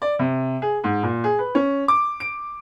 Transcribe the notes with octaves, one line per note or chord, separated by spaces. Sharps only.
D5
C3
G#4
G#2
A#2
G#4
B4
C#4
D6
D7